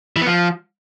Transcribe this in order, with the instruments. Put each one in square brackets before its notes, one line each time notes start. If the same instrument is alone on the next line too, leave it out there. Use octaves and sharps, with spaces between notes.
[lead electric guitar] E3
B3
F3